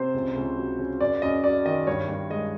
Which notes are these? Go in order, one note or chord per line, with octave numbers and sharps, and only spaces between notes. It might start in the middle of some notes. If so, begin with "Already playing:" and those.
Already playing: C3 C5
C#2
C#2
F#3
C#3
F#2 D5
F#2 D#5
F#3 D5
D#3 D#5
G2 C#5
G2
G#3 D#5